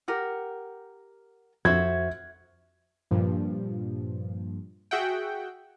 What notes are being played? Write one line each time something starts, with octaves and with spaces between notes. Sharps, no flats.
G4 A#4 F#5
F2 F#4 C5 E5 G#6
G2 A#2 F3
F#4 G#4 E5 F#5 G5